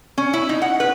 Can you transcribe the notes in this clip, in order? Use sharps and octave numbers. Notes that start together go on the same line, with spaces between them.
C#4
E4
D#4
F#5
B4